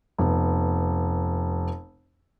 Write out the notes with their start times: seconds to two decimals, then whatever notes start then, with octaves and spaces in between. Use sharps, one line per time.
0.18 F1 B3